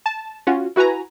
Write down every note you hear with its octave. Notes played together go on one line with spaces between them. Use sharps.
A5
C#4 F4 F#4
E4 F#4 B4 G#5 A#5